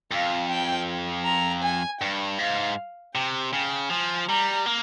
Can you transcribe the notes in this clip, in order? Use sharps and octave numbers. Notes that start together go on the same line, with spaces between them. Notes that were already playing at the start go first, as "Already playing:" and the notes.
F2 F5
G5
A#5
G#5
G2 G5
G#2 F5
C3 G5
C#3 G5
F3 G#5
G3 A#5
A#3